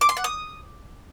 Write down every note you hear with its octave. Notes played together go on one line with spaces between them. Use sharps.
D6
C6
F#5
D#6